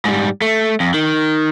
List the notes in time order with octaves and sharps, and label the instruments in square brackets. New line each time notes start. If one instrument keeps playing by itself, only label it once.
[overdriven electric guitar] G#2 G3
A3
F2
D#3